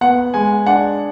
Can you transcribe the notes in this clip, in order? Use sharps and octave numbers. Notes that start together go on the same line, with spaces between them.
B3 F#5
G#3 G#5
D4 F#5